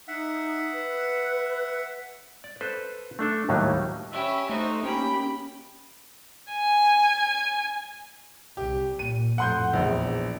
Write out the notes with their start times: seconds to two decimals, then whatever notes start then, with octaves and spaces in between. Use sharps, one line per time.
0.08 D#4 E5 F#5
0.73 B4
2.44 D5
2.61 A4 B4 C5
3.19 A3 D4 A4
3.49 D#2 A2 F#3 G3 D#4
4.13 C#4 G4 E5 B5
4.50 A3 D#4 F#4 C5
4.84 A#3 C#4 G4 G5 B5
6.51 G#5
8.57 C2 G4
8.99 A#2 D#7
9.38 F2 A2 F#5 C6 G6
9.73 A#1 E2